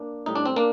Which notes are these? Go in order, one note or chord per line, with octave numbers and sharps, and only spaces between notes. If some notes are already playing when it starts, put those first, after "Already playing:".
Already playing: A#3 D4
A2 G3 D#4
D4
C4
A#3 D4